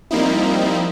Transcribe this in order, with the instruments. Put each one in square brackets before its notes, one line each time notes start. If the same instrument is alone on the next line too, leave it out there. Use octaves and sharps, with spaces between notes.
[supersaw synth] F3 G3 A#3 C4 D#4 E4